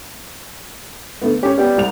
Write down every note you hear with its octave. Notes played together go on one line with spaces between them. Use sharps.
D3 A3 B3
C#4 G4 C#5
G3 B3 G4
C2 F7